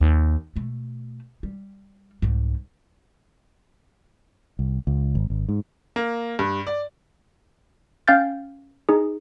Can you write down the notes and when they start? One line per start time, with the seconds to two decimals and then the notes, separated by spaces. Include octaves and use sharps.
0.01 D#2
0.56 B2 A3
1.43 G3
2.22 C2 G#2
4.59 C2
4.87 C#2
5.15 G#1
5.30 G#1
5.49 G#2
5.96 A#3
6.39 G2
6.67 D5
8.08 C#4 F5 G5 F6 G6 A6
8.89 D#4 G#4